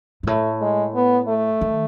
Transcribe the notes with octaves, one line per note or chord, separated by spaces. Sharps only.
G#2
A2 A3
G#3
B3
A3
D#3